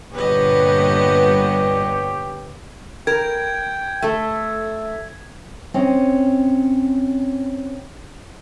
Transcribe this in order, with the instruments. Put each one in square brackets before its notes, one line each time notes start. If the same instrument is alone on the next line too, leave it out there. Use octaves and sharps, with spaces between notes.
[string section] G2 A#2 [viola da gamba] D3 B3 C#5 [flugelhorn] G4 [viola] B4 D#5
[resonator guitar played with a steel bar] A#4 [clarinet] G5 [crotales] G#6
[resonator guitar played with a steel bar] A3 A4 [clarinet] E5
[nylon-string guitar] C4 C#4 D#5